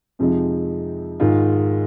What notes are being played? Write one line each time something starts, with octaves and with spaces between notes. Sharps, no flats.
F2 C3 F3 G#3 D#4
G#2 D#3 G#3 F4 G#4